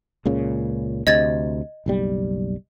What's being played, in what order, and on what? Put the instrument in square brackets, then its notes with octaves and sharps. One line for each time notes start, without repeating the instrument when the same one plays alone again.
[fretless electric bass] C#2 A#2 C#3
[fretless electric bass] D2 C3 [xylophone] D#5 G#6 A6
[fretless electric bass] F#1 B1 G3